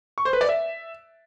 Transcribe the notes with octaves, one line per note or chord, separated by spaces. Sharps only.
C#6
C5
B4
D5
E5